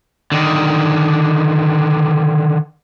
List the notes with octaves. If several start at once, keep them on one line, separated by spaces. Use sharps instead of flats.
D3 D#3